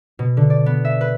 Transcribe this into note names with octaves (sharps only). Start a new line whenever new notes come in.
B2
D3
D5
B3
E5
B4